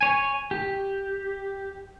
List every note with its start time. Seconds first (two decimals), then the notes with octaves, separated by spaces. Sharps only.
0.01 C#5 G#5
0.51 G4